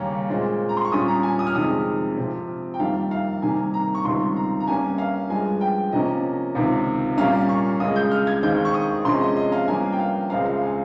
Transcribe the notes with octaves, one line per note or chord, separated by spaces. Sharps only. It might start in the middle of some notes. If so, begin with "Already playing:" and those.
Already playing: D#2 C#3 G3 A#3 C#4
A#2 G#3 C4
A#5
C6
C#6
A#2 G3 C#4 D#6
A#5
G#5
D#6
F6
F2 C3 D#3 G#3 D#6
C3 F3 C4
G5
F2 D#3 G3 A#3 F5
F5
C3 D#3 G3 A#3 G#5
A#5
C#6
C#2 C3 D#3 G3 C6
A#5
A#5
G2 G3 A#3 C#4 G#5
F5
G2 F3 G#3 G#5
G5
C3 F3 A#3 C#4 D#5
C#2 C3 D#3
A#2 G3 A#3 C#4 F5
C#6
C#2 C#3 G#3 D#6
G6
F6
G#6
D#2 D#3 G#3 C4 G6
C#6
D#6
C3 F3 G#3 C#4 C6
D#5
D#5
F5
G2 F3 A#3 C#4 G#5
G5
F5
C#2 C#3 G#3 C4 F5
F5
G#5